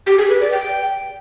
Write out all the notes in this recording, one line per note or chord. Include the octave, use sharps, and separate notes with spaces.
G4
G#4
B4
D5
G5